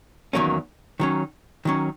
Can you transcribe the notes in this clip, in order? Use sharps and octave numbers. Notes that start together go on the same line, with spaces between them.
E2 D#3 F#3 A#3 C#4
D#3 F#3 C#4
D#3 F#3 C#4